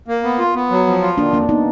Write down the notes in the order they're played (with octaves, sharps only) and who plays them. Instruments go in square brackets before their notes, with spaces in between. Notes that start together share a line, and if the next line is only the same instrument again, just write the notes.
[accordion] A#3
B3
F4
B3
F#3
F3
F4
[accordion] D#3 [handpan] A#3 D4
[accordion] F2 [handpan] A#3 D4
[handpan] B3 D#4